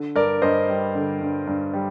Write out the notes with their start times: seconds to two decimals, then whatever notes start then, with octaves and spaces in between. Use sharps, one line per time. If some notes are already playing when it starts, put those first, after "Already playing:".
Already playing: D3
0.16 G2 A#4 D5
0.42 G2 C5 D#5
0.68 G3
0.95 D3
1.21 G2
1.47 G2
1.73 G3